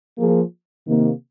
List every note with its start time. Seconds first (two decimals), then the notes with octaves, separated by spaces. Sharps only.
0.17 F3 A#3 F4 G#4
0.86 C3 D#3 A#3